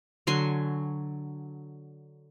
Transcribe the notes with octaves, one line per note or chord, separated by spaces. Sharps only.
D3 F#3 G#5 C6